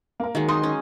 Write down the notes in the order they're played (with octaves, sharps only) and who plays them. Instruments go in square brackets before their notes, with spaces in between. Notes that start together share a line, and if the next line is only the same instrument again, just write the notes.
[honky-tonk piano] A#3 A#4
[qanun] D#3 F#3 G#3
[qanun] D#4 [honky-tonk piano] C6 D#6
[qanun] C#4